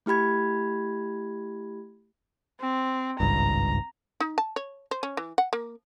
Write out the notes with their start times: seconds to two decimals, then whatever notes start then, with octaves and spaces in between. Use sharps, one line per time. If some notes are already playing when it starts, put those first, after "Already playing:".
0.06 A3 E4 G4 B5 G#6
2.61 C4
3.20 G#1 C#2 G2 A#5
4.20 D#4
4.38 A5
4.56 C#5
4.91 C5
5.03 C#4
5.17 E3
5.38 F#5
5.53 A#3